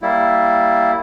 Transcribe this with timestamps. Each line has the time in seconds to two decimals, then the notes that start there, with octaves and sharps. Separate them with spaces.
0.02 G3 A#3 E4